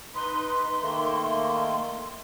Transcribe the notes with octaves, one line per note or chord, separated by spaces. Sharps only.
D#4 B4 C6
D#3 A3 A#3